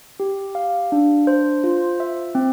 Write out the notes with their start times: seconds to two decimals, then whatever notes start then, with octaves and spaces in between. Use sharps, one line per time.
0.20 G4
0.55 F5
0.92 D4
1.27 C5
1.64 F4
2.00 E5
2.35 C4